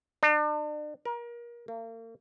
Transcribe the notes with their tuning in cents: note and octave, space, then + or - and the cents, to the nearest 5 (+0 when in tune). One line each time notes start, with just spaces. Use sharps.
D4 +40
A#4 +30
A#3 -40